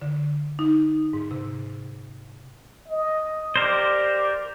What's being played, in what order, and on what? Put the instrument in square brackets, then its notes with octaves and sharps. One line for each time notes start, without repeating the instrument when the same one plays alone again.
[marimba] D3
D#4
G#2
C3
[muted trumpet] D#5
[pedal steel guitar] G4 A#4 C5 [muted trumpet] D5